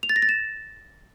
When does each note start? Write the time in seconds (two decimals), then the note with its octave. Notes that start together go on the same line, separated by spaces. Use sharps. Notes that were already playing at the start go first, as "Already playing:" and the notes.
0.03 F7
0.09 A6
0.16 A#6
0.22 A6
0.29 E7